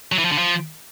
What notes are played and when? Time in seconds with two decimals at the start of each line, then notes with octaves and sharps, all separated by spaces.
0.12 F#3
0.19 E3
0.25 F3
0.32 D3
0.38 F3